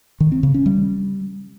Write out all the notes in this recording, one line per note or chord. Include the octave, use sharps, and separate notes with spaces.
D#3
C4
C#3
C#4
G3